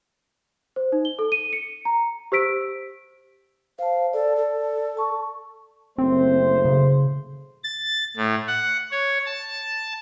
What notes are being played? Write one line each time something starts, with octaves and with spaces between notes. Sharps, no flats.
C5
D#4
G7
A4
D#7
C#7
A#5
G4 C5 E6 B6 D7
C5 F5 A5
A4 D5 A5
A4
A5 C#6
F#1 A3 C4 C5
C#3
A6
A2
F#5
C#5
A5